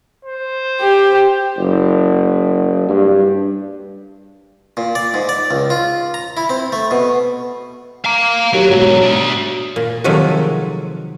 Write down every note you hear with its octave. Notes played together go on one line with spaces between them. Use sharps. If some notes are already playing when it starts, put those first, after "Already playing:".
C5
G4
F#1
G2
A#2
D5
G#2
D5
C#2
F4
A#5
E4
C4
A3
B2
F5 A#5
D#2 F#3
G#2 B2 F#3
D4 E5
A#2
C3 D#3 F3 F#3 G#3 A3